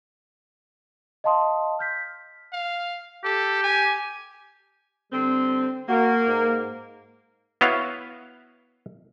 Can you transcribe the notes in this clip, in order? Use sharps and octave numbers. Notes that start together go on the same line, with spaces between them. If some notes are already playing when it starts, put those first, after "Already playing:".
D#5 F5 A5 C6 D#6
F6 G6 B6
F5
G4 A4
G#5
D3 G3 C4
A#3 F#4
G#2
B3 E4 F#4 B4 C#5 F5